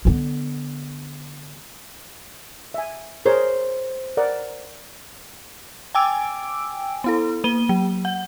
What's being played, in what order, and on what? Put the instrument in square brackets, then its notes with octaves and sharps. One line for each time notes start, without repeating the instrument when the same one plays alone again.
[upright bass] D3 B3
[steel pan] E5 G#5
[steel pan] G#4 A#4 C#5 [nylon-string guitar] C5
[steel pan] A#4 D5 F#5
[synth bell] G5 G#5 D6 E6 D7
B3 E4 A4
A#3 D#7 G7
F#3
F#5